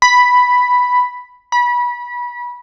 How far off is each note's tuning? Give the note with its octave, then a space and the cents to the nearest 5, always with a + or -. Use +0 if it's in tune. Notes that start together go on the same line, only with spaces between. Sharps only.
B5 +0
B5 -25